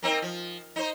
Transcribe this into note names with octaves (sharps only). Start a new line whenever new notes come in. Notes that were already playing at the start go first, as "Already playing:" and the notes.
A#3 C4 D#4
F3
D#4 C5